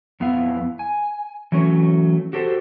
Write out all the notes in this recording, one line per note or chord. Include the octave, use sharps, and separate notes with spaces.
F2 B3 E4 F5
G#5
E3 F#3 A3 C#4
F#4 G4 A4 C5